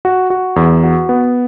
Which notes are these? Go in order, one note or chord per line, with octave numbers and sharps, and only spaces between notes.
F#4
F#4
E2
F#4
B3